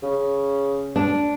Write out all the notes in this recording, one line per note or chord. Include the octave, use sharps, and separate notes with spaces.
C#3
D4